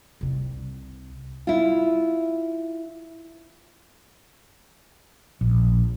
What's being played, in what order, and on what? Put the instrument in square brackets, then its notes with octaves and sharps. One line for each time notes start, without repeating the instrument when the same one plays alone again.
[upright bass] C2 C3
[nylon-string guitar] E4 F4
[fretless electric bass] A#1